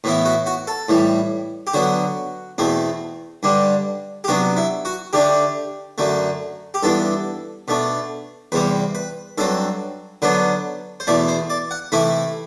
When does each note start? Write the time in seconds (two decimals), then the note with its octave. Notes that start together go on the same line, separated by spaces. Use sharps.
0.04 A2 E3 B3 E4
0.25 F#4
0.46 F#4
0.67 A4
0.89 A2 E3 G3
1.67 G4
1.73 D3 F#3 B3 F#4
2.58 E2 B2 A3 C4
3.43 G2 D3 G3 D4
4.24 G4
4.28 C3 F#3 B3 D4 F#4
4.57 E4
4.85 F#4
5.13 D3 A3 D4 G4
5.98 F#2 D3 A3
6.74 G4
6.83 G2 E3 B3 D4 A4
7.68 B2 A3 D4
8.52 E2 C3 G3 C4 B4
8.95 B4
9.38 G2 F#3 C4 A4
10.22 D3 F#3 B3 D4 B4
11.00 C5
11.07 E2 B2 A3 D5
11.28 C5
11.50 D5
11.71 F#5
11.92 C3 E3 A3 E4 B5